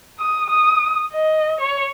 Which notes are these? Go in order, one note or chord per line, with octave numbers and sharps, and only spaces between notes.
D#6
D#6
D#5
C#5